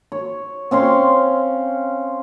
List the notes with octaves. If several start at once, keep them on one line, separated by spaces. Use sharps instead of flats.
C#5
C4 C#4 F5 C6